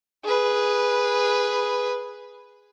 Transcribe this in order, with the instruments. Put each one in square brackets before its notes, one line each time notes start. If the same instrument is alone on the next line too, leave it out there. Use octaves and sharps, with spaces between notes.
[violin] G#4 B4